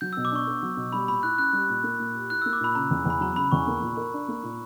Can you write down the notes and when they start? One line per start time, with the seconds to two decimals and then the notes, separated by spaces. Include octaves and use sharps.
0.01 F#3 G6
0.13 E6
0.17 B2
0.25 D6
0.31 D4 C#6
0.47 B3
0.63 F#3
0.77 B2
0.93 G3 B5
1.08 A#2 B5
1.23 E4 F#6
1.38 C#4 F#6
1.53 G3
1.70 A#2
1.84 A#3
2.00 A#2
2.15 G4
2.30 E4 F#6
2.42 E6
2.46 A#3
2.53 D6
2.61 A#2 B5
2.75 C#3 A#5
2.91 E2
3.06 E2 B5
3.21 F#3 A#5
3.36 C#3 B5
3.52 E2 C#6
3.67 A#3
3.82 A#2
3.97 A#4
4.13 D4
4.29 A#3
4.43 A#2